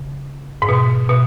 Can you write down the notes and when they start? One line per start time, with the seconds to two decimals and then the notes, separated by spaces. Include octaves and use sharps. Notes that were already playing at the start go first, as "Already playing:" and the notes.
Already playing: C#3
0.62 G#2
0.69 B2
1.09 B2